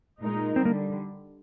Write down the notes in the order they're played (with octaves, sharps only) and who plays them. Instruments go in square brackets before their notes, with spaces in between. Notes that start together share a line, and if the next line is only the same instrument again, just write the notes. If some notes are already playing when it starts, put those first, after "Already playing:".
[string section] A#2 G#3 D#4 A#4
[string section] D3 [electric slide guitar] C4
[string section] G3
[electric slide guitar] A#3